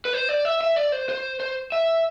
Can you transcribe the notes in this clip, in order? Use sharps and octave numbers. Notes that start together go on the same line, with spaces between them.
B4
C5
D5
E5
E5
D5
C5
C5
C5
E5